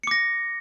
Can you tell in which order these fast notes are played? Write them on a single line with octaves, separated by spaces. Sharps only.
C#7 D6 A#6